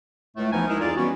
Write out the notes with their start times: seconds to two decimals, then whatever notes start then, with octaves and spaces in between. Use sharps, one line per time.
0.36 C#2 A2 A3
0.53 D2 E3 F3 B3 D#4 G#5
0.68 G#3 D#4 E4 A#4
0.81 F2 D#4 F4 G#4 D5
0.96 E3 G3 B3 C#4 F#4